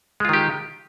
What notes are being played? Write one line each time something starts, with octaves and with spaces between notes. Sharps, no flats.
D#3 G#3 F4 G4